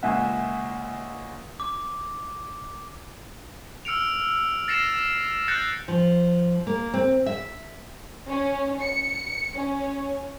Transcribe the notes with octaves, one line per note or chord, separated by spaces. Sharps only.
C#2 A#2 E5 F#5 G#5
D6
E6 F6 C#7 D7 F7
F6 A6 A#6 C7 C#7 E7
E6 F#6 G6 A6 A#6 C#7
F3
A#3
C4
E5
C#4
C#7
C#4